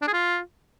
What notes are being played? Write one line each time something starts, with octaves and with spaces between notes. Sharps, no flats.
D4
G#4
F4